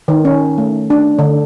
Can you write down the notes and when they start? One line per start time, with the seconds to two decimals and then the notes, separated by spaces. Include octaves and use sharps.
0.08 D#3
0.25 C#4
0.58 A3
0.90 D4
1.19 D3